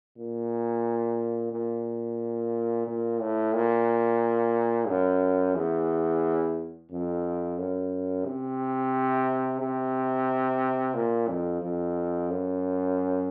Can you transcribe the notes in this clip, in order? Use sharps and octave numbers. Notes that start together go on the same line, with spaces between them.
A#2
A#2
A#2
A2
A#2
F#2
E2
F2
F#2
C3
C3
A#2
F2
F2
F#2